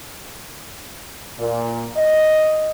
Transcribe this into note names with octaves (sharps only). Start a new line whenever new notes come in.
A#2
D#5